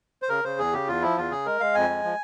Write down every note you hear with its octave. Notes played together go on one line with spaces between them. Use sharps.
C5
C#3 A#4
C#3 C5
E2 G#4
C#3 G4
E2 F4
F3 E4
E2 F4
C#3 G#4
G#3 A#4
G#3 F5
F2 G#5
G#3
F3